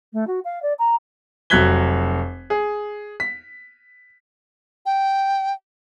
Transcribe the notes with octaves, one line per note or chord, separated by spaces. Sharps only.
A3
F#4
F5
D5
A#5
F1 F#3 F#6 G#6 B6 G7
G#4
B6
G5